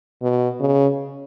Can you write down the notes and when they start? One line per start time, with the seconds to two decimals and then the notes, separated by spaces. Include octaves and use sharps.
0.22 B2
0.60 C#3